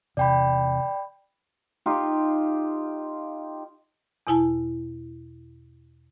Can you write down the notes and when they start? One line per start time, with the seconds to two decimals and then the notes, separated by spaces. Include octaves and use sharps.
0.17 E2 C3 D5 G5 B5
1.86 D#4 F4 G4
4.27 E2 B2 E4 G#5 A5